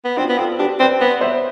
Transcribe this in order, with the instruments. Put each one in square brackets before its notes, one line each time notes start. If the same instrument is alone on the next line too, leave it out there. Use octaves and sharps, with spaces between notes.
[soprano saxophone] B3
[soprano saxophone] C4 [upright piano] D4 F4
[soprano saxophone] B3
[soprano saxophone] C4 [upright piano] F4 A4
[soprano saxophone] D4 [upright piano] G4 B4
[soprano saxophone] C4 [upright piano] B4 D5
[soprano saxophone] B3 [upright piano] B4 D5
[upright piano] C5 E5